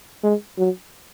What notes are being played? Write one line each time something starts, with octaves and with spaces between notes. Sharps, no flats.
G#3
F#3